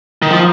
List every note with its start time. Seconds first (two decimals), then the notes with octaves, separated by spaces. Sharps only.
0.22 D#3
0.31 F3